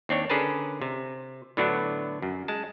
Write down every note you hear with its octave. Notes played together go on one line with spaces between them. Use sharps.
D#2 C4 D4 C#5
D3 C#4 G#4 A#4 B4 A5
C3
A2 D3 F#3 B3 D4 E4
F#2
G#3 A5